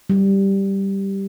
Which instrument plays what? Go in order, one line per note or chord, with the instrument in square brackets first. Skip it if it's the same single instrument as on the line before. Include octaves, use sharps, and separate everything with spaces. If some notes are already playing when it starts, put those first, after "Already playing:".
[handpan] G3